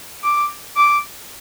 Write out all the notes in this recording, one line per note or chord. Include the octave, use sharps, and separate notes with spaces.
D6
D6